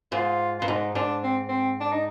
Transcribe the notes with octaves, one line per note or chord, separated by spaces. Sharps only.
G#2 F4
G2 F4
G#2 D#4
G#2 D4
C4
C4
D4
D#4